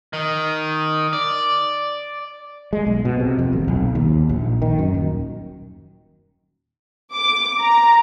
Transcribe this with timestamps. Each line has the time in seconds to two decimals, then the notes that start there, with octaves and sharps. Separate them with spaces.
0.13 D#3
1.13 D5
2.73 G#3
2.86 B1
3.05 B2
3.20 C3
3.39 F2
3.53 D#1
3.68 B1
3.95 D#2
4.29 A#1
4.62 D#3
4.79 F#2
4.94 D#1
7.14 D6
7.62 A#5